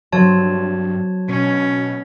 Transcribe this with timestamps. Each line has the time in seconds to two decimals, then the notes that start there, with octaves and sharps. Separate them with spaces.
0.12 G2 F#3 C4 C#5 A5
1.29 B2 C#4